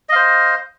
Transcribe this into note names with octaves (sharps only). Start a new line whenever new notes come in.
C5 D#5 F5